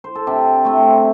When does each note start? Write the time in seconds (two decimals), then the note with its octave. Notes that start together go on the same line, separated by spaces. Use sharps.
0.04 C5
0.15 A4
0.27 C3 D4 G4
0.65 A3 C4